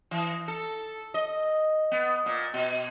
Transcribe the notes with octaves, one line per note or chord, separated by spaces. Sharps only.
E3
A4
D#5
B3
A#2
B2